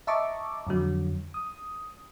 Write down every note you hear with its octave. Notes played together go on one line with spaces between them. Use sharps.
D#5 E5 A5 A#5 C#6 D6
F2 D3 F#3
D#6